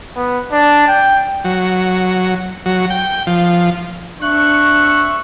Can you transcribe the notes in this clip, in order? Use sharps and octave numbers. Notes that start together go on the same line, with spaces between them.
B3
D4
G5
F#3
F#3
G5
F3
C4 D4 E5 C#6 F#6